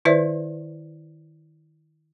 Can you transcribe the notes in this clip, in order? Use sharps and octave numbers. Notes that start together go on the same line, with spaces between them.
D#3 E4 B4 C5 D5 E5